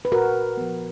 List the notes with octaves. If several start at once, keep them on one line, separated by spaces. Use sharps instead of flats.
B4
A#2 F#4 A#4
F3 B3